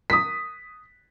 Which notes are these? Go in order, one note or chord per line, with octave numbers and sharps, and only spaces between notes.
D#6 B6